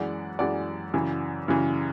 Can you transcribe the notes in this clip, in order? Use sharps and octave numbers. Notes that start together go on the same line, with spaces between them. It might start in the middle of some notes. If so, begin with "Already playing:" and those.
Already playing: F#2 E3 G#3 D5 F#5
F#2 E3 G#3 D5 F#5
F#2 C#3 E3
F#2 C#3 E3